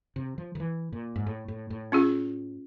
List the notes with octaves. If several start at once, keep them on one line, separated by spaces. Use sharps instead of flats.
C3
F3
D#3
E3
A#2
G#2
A2
A2
A2
C#4 F4 G#4